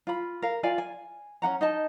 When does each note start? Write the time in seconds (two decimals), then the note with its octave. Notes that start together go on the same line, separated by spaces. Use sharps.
0.07 F4 B5
0.42 A#4 F5
0.63 F4 D5 F5 G#5
0.78 G#5
1.42 C#4 D4 F#5 A#5
1.61 D#4 D#5 A5